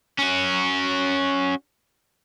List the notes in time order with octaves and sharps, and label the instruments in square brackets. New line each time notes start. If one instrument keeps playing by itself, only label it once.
[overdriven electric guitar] C#4 F#4